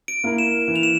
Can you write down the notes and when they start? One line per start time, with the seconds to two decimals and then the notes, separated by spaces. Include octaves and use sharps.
0.08 D7
0.24 A#3 E4 A#4
0.38 E7
0.68 E3
0.76 F7
0.83 E7